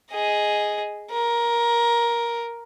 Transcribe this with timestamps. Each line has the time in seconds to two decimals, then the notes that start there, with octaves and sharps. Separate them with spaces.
0.12 G#4 D#5
1.11 A#4